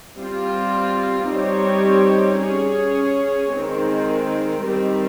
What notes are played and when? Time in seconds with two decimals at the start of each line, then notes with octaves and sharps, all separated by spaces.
0.16 G3 C4 F4
1.28 G3 C4 D#4 G4 C#5
2.40 C#4 G#4 C#5
3.52 D#3 G#3 C4
4.65 D#3 G3 C4